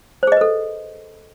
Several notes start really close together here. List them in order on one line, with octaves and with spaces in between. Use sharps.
C5 G#4 D#5 B4 A4